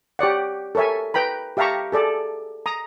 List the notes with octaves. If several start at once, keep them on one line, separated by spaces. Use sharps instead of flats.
G4 C#5 D5 F#5
A4 A#4 C#5 E5 G#5
B4 G5 A#5 B5
G4 E5 F5 A5 A#5 C#6
G#4 A4 D5
A#5 D#6